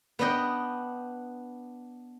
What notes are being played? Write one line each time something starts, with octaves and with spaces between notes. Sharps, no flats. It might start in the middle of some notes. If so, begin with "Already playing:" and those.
B3 D4 B4 D#5 G5